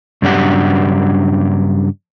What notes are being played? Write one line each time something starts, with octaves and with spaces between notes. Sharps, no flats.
G2 C#3 F#3 D4 G4 F#5